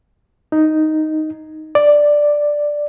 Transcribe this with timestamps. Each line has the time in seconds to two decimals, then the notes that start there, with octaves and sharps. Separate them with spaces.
0.52 D#4
1.75 D5